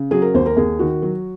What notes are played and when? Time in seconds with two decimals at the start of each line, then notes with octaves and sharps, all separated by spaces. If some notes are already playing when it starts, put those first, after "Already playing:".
Already playing: C#3
0.11 F#3 G#4
0.22 A#4
0.34 D#2 C5
0.46 A#4
0.56 D#2 G#4
0.79 D#3 F#4
1.02 F#3